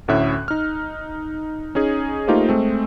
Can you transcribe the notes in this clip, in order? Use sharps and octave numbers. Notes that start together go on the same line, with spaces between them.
D2 A2 C#4 E5 F#6
D#4 F6
C#4 D#4 G#4
A3 A#3 D#4 F4 G4 C5
G#3 A3 C4